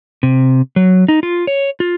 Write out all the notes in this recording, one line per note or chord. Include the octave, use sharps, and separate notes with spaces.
C3
F#3
D#4
F4
C#5
F4